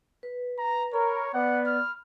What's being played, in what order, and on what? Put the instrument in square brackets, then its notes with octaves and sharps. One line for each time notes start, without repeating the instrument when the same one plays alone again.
[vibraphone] B4
[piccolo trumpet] A#5
[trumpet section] A#4 [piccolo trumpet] C#5 [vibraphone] B5
[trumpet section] B3 B4 D5 [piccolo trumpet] F#5
[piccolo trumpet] F6